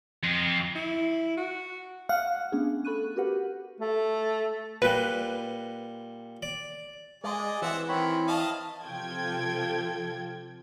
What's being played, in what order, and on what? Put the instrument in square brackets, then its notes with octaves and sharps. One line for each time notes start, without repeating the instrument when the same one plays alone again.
[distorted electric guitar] F2
[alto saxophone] E4
F#4
[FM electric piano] F5 [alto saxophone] F#5
[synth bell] A3 B3 C#4 D4 G#4
A4 B5 C#6 F#6 D#7
F#4 G4 A#4 B4 F#5
[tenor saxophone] A3
[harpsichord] A#2 G3 [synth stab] B4
[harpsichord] D5
[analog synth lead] G#3 [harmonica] G#4 D5 D#5
[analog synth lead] E3 [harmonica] C4 E5 F#5
[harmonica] D#3 [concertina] C4 C#5 B5
[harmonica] D#5 F5 A5
[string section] C3 F3 F4 A4 G5 G#6